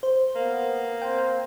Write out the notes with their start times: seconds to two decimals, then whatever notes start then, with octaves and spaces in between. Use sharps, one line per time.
0.03 C5
0.36 A#3 B3
1.02 C4 C5 G5